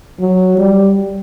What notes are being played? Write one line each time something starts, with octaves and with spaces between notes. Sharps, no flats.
F#3
G3